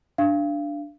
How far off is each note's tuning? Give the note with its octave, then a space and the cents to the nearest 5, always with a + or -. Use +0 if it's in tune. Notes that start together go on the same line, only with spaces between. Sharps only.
D4 +0 F5 -25